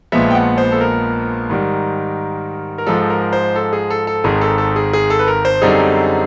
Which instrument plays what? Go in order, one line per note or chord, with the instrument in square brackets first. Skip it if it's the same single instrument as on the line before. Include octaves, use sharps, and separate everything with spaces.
[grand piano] A#1 A#2 F3 G#3 B3 E5
G5
F#5
C5
A4
A#4
G#2 D#3 G3
A#4
G#2 F3 G#3 A4
A#4
C5
A4
G#4
A4
A4
G#1 G#2 D#3 G#3 G#4
A4
A4
G#4
G#4
A4
B4
A#4
C5
F#2 D3 G3 C4 D#4 G#4